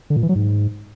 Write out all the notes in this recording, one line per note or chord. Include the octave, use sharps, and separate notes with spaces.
D3
A#2
E3
F#3
G#2